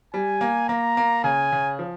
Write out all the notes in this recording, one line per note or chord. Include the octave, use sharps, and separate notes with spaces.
G3 G#5
A#3
A#3 A#5
A#3
C#3 G#5
C#3
F3